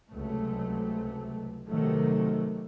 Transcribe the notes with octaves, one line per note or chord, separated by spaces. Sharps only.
C#2 C3 F#3 A3
C3 D#3 F#3 A3